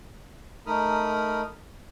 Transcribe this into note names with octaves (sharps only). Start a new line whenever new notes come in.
A3 D#4 A#4 B5 D#6 F6